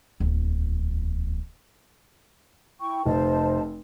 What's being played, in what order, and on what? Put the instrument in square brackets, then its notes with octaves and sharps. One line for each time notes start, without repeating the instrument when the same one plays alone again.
[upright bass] D1 E2
[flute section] E4 G5 C#6
[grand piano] F1 [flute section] C5 D#5 A5